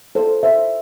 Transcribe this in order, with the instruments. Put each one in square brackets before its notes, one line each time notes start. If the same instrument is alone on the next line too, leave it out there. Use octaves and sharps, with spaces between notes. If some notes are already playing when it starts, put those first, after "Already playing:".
[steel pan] A4 C5
C5 E5